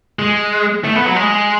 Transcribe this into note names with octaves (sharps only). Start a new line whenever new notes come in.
G#3
A3
B3
F#3
G#3